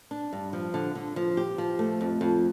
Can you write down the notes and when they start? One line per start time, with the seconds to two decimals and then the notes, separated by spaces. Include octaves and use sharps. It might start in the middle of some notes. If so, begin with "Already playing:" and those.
0.11 D4
0.33 G2
0.53 F3
0.74 D3
0.95 D3
1.16 F3
1.37 G4
1.58 F3
1.79 A3
2.01 F2
2.21 F2